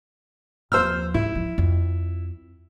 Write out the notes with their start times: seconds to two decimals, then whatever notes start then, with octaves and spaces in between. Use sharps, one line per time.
0.72 D#2 F3 C5 E6 F6
1.14 G#2 E4
1.35 F3
1.58 F2